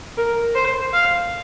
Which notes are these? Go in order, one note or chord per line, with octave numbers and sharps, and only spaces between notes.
A#4
C5
F5